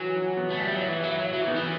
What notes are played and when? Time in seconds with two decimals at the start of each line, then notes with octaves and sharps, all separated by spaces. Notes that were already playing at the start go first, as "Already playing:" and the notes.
Already playing: E3 F#3 B4
0.16 E3
0.37 B3
0.50 A3
0.60 G3 E4
0.74 F#3
0.82 E4
0.88 E3
1.03 F#3 E4
1.19 F#3
1.26 E4
1.33 F#3
1.41 E3
1.47 D#3 B3
1.57 E3